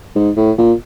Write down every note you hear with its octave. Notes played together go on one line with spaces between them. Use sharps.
G#2
A2
A#2